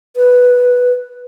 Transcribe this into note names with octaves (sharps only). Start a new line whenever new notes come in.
B4